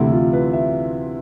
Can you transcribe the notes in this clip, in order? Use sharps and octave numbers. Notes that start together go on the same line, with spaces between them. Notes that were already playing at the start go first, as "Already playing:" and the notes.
Already playing: D2 C3 E3 A3 E4
F4
B4
E5